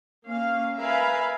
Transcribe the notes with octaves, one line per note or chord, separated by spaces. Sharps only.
A#3 C#4 F5
A#4 B4 E5 F5 G#5 B5